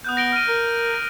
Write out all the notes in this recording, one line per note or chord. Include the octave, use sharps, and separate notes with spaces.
B3 D#6 F#6 G6
A#6 D7 G7
F6 D#7
A#4
A#6